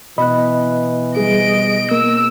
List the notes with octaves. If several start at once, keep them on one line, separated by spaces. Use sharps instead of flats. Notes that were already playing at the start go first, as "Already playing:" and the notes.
B2 E3 B3 D#5 B5 F#6
G3 G#4 D#5 D7
A#3 A#4 E6